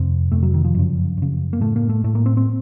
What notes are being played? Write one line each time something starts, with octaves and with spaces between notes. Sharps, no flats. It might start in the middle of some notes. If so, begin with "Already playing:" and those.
Already playing: F2 C3 C4
F2 C3 A3
F#3
D#3
F3
F#2 C#3
F#2 C#3
A#3
A2 A3
A#3
A3
A2 A3
A#3
C4
C4